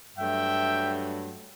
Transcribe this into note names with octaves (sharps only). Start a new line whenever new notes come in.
G2 F#3 A3 E5 G5